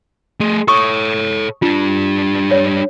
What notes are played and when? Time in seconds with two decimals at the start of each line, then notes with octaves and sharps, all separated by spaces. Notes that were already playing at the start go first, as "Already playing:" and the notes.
0.40 A3 G#4
0.68 A4 C#5 C#6 D#6
1.62 G3 D4 F4
2.51 C#5